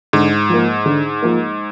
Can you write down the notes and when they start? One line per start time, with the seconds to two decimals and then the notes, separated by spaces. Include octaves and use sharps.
0.13 G#2 D3
0.49 F3 A#3
0.86 D3
1.22 F3 A#3